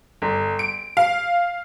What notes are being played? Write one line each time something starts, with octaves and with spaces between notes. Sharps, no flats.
G1
D7
F5